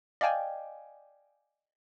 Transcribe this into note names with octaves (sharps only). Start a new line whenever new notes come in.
D5 D#5 F5 G5 G#5